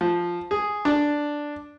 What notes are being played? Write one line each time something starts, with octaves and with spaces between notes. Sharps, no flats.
F3
G#4
D4